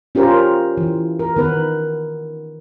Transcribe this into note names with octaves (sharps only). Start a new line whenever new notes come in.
C#4 F4 G4 A#4 C5
E3
A#4
D#3 B3 B4